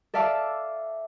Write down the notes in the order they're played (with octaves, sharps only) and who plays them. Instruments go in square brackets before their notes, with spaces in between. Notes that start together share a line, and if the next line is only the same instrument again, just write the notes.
[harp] A4 D5 E5 F5 A5 D6